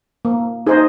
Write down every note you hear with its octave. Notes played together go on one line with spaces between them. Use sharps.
A#3
D#4 G#4 C5 D#5